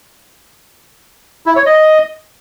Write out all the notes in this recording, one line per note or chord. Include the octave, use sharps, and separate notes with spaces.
E4
C#5
D#5